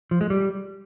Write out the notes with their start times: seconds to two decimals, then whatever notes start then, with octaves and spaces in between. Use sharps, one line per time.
0.11 F3
0.21 G#3
0.30 G3